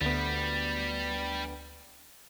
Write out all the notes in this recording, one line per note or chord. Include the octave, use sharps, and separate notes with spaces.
D2 G3 B3